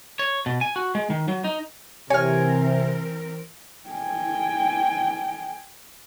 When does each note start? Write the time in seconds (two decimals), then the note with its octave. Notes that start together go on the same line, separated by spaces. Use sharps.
0.19 C#5
0.46 B2
0.61 G#5
0.76 F#4
0.95 G#3
1.10 D#3
1.28 F#3
1.44 D#4
2.10 C3 E3 C4 A#4 C#5 G#5 F6
3.89 G5 G#5